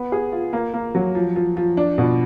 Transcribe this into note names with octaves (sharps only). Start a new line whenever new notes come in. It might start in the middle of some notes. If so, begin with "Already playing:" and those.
Already playing: B3
G#4
F4
A#3
A#3
F#3
F3
F3
F3
D4
B2